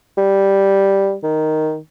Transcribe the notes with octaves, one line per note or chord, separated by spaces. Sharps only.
G3
D#3